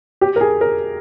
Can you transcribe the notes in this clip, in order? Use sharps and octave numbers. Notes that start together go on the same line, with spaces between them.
G4
A#4
G#4
A#4